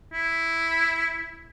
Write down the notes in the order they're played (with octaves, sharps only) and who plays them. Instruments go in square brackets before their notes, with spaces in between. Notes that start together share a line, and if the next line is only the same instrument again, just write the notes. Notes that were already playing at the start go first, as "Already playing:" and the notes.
[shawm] E4